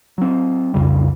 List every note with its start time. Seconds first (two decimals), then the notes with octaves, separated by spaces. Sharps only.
0.18 F#3 C4
0.74 B1 F2 C#3 G3